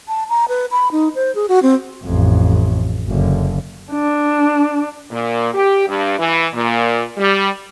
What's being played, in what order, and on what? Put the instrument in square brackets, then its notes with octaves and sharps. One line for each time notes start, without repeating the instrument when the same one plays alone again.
[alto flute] A5
A#5
B4
B5
D#4
C5
G#4
F#4
C4
[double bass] A1 F2
F#1 D3
[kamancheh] D4
[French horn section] A#2
G4
G2
E3
A#2
G3